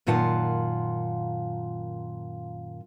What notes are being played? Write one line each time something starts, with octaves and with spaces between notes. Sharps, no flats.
F#2 A#2 D#3 F4 F#5 A5